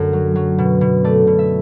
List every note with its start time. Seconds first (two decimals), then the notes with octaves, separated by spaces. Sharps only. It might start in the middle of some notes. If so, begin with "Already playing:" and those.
Already playing: F#2 D3 A3
0.13 F#3
0.36 F#3
0.58 B2
0.81 B2
1.04 A3 D5
1.27 B2
1.39 E5